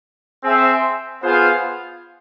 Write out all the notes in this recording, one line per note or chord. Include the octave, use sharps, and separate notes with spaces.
C4 G#4 C5 E5
B3 F4 G#4 C5 F5